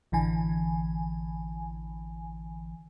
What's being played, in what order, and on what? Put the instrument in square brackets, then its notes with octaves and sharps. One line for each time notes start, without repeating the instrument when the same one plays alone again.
[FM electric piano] A1 D3 E3 G#5